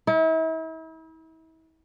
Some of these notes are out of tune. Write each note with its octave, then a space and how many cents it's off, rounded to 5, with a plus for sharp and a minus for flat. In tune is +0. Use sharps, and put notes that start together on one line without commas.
E4 -40